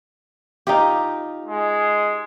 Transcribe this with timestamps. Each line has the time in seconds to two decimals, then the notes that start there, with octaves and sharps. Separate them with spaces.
0.67 D#4 F4 G4
1.46 G#3